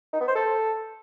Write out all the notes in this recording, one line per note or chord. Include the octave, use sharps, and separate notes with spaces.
D#4
B3
C5
A4